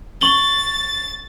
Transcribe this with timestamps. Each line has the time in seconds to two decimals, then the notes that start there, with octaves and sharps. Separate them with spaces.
0.21 C#6 A6 F#7 G7